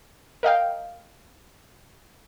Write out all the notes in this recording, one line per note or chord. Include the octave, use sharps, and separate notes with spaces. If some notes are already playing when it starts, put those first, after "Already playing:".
A#4 D#5 F5 G5